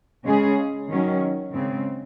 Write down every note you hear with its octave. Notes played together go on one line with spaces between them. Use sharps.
C#3 G#3 C#4 G#4
D#3 F#3 C#4
C#3 G#3 C4